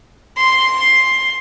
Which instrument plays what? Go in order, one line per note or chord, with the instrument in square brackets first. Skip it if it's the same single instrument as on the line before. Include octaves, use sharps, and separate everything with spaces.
[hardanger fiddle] C6